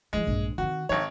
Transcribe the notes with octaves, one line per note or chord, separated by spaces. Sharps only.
D#3 E3 G#3
A#1 G2
D#3 C4 F#4
G#1 D#4 C#5